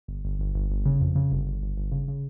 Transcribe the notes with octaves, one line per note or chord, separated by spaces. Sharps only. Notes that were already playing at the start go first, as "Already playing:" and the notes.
G1
G1
G1
G1
G1
C#3
F2
C#3
G1
G1
G1
G1
C#3
C#3